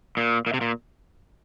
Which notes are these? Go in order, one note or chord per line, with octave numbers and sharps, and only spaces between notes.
A#2
A#2
C3
A#2